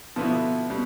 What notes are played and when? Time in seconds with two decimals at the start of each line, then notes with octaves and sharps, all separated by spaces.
0.16 B2 D3 F3 B3 E4
0.70 B2 G3